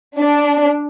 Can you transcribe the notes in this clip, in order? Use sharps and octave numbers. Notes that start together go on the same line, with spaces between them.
D4